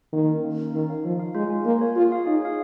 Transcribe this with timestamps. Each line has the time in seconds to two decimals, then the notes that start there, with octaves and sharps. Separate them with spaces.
0.13 D#3 A#3
0.28 C#4 A#4
0.44 A#3
0.59 C#4 A#4
0.74 D#3 D#4
0.89 C#5 F5
1.05 F3 D#4
1.19 C#5 F5
1.35 G#3 F4
1.50 C#5 F5 G#5
1.66 A#3 F4
1.81 C#5 F5 G#5
1.96 F4 G#4
2.12 C#5 F5
2.26 D#4 G#4
2.42 C#5 F5